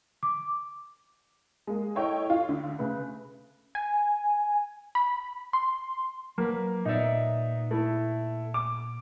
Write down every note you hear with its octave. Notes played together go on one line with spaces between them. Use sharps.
D6
G#3 A#3
E4 A4 C#5 D#5 G5
F4
D2 D3
C#3 A3 B4
G#5
B5
C6
F#3 A#3 B4
A#2 B3 D#4 D5 E5
A3 E4
D6